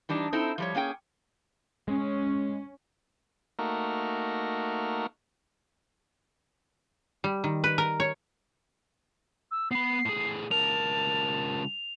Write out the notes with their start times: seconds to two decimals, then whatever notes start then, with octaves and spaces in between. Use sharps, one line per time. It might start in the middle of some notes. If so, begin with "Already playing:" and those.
0.09 E3 G3 D4 D#4
0.33 C4 D#4 E4 A4
0.58 F3 G3 C#5
0.75 A#3 C#4 G#4 G5
1.88 G#3 C#4
3.59 A3 A#3 D#4 F#4 A#4
7.24 G3
7.44 D#3
7.64 B4
7.78 A#4
8.00 C#5
9.51 E6
9.71 B3 B5 C7
10.06 A2 G#4
10.51 C#2 A#4 A5 F7